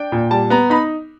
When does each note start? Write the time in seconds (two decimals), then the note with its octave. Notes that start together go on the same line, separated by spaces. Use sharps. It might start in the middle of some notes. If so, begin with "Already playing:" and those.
Already playing: D4 G5
0.12 A#2
0.31 G3 A5
0.50 B3 A#5
0.70 D#4 B5